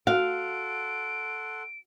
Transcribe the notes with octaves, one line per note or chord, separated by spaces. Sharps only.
F#4 A4 F5 F#5 C6 D7